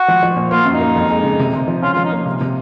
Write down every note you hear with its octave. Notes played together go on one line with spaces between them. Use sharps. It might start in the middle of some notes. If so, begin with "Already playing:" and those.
Already playing: F#4
F3
F3
A#2
A#3 F4
F#2
D#4
A#3
F2
G#3
C#3
C3
C3
F3
C#4 F4
F4
F3
D#4
A#3
C3
C3